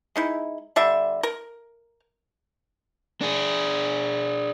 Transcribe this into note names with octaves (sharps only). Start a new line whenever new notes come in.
G#3 D#4 E4
D3 G3 E5
A#4
D4 G#4